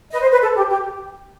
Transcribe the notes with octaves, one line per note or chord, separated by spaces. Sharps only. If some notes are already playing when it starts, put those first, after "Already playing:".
B4 D#5
C5
B4
A4
G4
G4